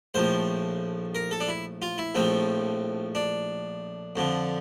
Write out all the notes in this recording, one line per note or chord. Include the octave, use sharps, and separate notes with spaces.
A#1 A2 F3 C5
A#4
A4
D4
E4
F4
E4
A#1 A2 F3 C4
D4
F2 D3 F3